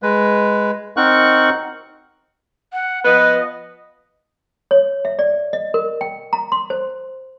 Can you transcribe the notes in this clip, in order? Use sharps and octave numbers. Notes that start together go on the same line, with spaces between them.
G#3 B4
C4 D#4 A#4 F#5 C#6 F#6
F#5
F3 B3 B4 D#5
C#5
E5
D5
D#5
A#4
G5
A#5
C6
C5